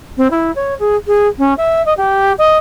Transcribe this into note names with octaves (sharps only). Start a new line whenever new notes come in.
C4
E4
C#5
G#4
G#4
C#4
E5
D#5
G4
D#5